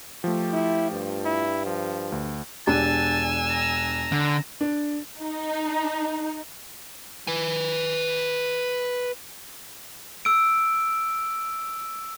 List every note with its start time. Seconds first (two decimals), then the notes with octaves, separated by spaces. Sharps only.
0.24 F3 A3 G4
0.53 E4
0.92 G2
1.26 E4
1.66 F3
2.12 D2
2.67 E1 D4 G4 G#5 A5 E6
3.50 A#5
4.12 D3
4.61 D4
5.20 D#4
7.27 B4 G#5
10.25 E6 D7